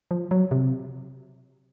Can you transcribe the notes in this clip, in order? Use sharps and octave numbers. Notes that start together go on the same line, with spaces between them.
F3
F#3
C3